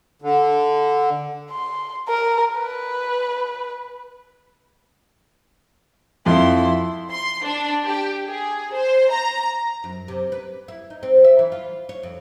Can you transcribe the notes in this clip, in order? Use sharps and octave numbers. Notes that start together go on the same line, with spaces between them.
D3
C6
A#4
B4
F2 E4 C6
C6
D4
G4
G#4
C5
A#5
F#2
C3
B4
E4
D#4
C4
E5
E3
F4
C#5
F2